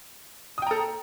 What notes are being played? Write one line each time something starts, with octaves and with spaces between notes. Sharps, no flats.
A4 G5 A#5 D#6